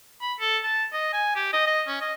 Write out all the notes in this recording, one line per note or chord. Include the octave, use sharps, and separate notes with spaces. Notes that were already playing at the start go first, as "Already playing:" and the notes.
B5
A4
A5
D#5
G#5
G4
D#5
D#5
C#4
D#5